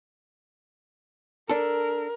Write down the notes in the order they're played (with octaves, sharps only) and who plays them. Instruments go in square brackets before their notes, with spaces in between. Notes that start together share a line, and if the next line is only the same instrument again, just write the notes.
[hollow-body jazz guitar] D4 A4 [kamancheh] A#4